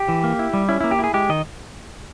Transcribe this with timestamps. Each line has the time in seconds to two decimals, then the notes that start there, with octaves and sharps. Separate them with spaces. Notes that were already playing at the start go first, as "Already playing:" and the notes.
Already playing: G4
0.09 E3
0.24 A#3
0.39 E4
0.54 G3
0.69 C#4 E4
0.81 A#3 E4
0.91 G4
0.99 E4 G#4
1.14 G#3 G4
1.29 D#3 D#5